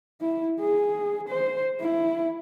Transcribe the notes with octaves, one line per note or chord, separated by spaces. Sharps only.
E4
G#4
C5
E4